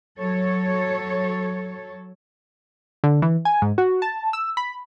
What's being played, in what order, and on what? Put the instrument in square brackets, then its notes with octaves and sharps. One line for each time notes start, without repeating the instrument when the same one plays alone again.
[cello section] F#3 A4 C#5
[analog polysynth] D3
E3
G#5
G#2
F#4
A5
E6
B5